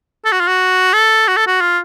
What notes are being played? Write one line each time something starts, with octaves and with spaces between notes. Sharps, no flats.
A4
F#4
F4
F#4
A4
F#4
A4
F#4
F4